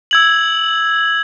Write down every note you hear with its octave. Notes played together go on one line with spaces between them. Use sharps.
E6 G#6 F#7